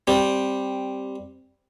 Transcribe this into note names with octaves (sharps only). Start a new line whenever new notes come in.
G3 C4